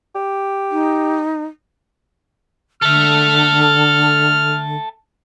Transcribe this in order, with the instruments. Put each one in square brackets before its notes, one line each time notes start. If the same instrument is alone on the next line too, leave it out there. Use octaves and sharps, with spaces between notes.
[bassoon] G4
[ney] D#4
[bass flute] D3 [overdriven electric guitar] A4 E5 [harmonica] F6